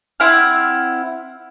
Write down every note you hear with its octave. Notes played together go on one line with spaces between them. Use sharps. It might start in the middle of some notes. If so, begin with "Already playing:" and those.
C4 E4 F#5 F6